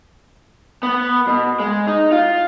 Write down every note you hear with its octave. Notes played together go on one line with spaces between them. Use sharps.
B3
B2
G#3
D#4
F4